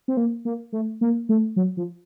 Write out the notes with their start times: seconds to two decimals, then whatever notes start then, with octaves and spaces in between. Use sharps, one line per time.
0.08 C4
0.17 A#3
0.45 A#3
0.72 A3
1.01 A#3
1.29 A3
1.56 F#3
1.77 F3